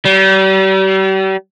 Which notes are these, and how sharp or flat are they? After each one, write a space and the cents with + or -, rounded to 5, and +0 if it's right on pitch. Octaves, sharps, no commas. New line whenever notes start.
G3 -40